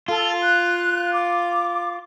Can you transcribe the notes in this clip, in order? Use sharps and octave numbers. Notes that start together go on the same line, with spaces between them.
F4 A4
F#6
D6